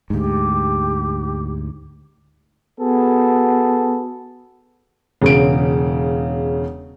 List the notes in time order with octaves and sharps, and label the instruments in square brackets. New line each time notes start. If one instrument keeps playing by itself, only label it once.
[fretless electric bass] D2 G#2 [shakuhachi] G4
[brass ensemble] B3 F#4 G#4 A4
[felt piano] E1 C#3 D7